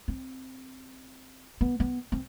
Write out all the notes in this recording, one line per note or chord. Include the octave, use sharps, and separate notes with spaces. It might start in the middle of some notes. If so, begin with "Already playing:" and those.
C4
B3
B3
C4